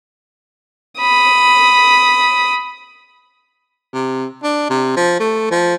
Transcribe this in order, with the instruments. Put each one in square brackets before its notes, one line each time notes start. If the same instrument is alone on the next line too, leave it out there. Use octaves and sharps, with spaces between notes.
[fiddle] B5 D#6
[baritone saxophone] C3
D4
C3
F3
A3
F3